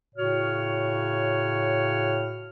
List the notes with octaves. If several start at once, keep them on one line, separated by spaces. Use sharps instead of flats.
A2 C#3 F#4 C#5 F6